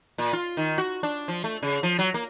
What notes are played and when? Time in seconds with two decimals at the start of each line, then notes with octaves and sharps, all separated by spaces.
0.18 A#2
0.33 F4
0.57 D#3
0.78 F#4
1.03 D4
1.28 F3
1.44 A3
1.63 C#3
1.83 F3
1.99 F#3
2.14 A#3